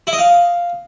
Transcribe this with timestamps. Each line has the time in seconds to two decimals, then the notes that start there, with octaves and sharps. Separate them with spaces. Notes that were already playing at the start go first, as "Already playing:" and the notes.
0.07 E4
0.13 D#5
0.18 F5